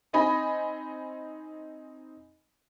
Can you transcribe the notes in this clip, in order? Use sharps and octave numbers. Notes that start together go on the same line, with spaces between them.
C4 D#4 D#5 G#5 B5